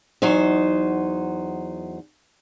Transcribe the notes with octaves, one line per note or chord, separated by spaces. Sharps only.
E2 F#3 D#4 C5